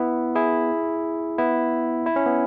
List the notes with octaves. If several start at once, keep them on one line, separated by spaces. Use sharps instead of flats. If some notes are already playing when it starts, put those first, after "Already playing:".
Already playing: B3 E4
E4 G#4
B3 E4
E4
C#4
B3